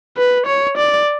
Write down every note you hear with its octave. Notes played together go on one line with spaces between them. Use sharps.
B4
C#5
D5